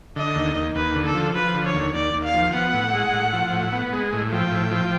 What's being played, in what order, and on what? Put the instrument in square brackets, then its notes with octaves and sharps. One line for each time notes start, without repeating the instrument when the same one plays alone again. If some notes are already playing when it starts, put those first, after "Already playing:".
[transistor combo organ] D3 [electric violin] D#5
[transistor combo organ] D#2
D#2
[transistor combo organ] D#2 [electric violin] B4
[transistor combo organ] D3
[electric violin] A4
[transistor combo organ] F3
[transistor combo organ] F3 [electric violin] B4
[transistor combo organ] D3
[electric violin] C#5
[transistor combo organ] D#2
[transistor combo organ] D#2 [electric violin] D5
[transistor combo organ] D#2
[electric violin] F5
[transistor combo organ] F3
[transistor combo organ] B3 [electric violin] F#5
[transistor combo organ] A2
G#3
A2
F3
A2
B3
G#3
A2
[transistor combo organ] F3 [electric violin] G5
[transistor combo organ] A2
F3